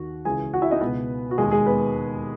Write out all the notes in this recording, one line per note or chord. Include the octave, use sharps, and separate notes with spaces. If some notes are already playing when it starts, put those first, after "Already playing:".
Already playing: D#2 D#3 F#4
C#2 C#3 E3 G#4 G#5
F#4 F#5
E4 E5
D#4 D#5
C#2 B2 B3 B4
F#4
E1 D#2 D#3 G#3 G#4
G#3 G#4
B3 B4